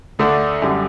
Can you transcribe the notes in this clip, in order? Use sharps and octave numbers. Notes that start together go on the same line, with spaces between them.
D2 D3 A3 D4
F#2 D3 G3